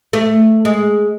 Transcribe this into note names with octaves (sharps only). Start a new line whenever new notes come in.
A3
G#3